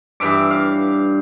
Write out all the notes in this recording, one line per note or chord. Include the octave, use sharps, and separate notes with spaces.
G2 E3 E5 D6
F5